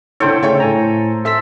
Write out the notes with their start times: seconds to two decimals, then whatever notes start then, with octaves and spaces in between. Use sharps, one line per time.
0.20 D3 E4 A4 C5 C#5 G5
0.43 C#3 A3 C#4 C#5 G5 C#6
0.60 A2 G#5 A#5
1.25 A4 E5 C6 E6 B6